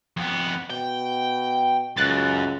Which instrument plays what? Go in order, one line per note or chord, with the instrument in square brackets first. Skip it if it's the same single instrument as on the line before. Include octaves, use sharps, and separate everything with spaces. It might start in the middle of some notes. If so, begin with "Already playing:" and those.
[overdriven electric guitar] F2 B3
[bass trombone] B2 [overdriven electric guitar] G5
[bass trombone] C#2 [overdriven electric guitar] F#2 [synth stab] F#6 A6